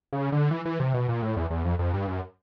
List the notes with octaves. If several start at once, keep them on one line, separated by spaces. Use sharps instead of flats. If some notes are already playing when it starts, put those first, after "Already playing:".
C#3
D3
E3
E3
C3
B2
A#2
A2
E2
E2
F2
F2
G2
F#2